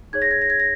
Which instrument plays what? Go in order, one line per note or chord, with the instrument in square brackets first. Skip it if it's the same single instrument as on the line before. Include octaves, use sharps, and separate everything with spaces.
[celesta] D#4 G#4 C#5 G#6
A#6
G#6
A#6
G#6
A#6